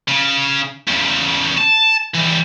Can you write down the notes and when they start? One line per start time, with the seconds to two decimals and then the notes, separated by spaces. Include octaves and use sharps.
0.08 C#3
0.88 E2 C#3
1.57 A5
2.14 E3 G3